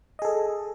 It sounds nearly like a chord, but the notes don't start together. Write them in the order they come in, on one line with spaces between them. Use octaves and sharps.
D#5 G#4 A4